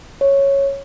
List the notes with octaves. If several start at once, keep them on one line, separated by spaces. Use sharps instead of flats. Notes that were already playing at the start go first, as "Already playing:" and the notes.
C#5